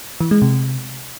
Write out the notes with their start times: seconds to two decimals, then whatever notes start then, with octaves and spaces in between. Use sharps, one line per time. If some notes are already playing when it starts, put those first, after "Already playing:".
0.20 E3
0.31 G#3
0.42 C3